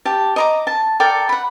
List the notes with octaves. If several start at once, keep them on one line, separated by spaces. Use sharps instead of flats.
G4 A5
D#5 A#5 D6
A5
A4 A#4 D5 G5
F#5 B5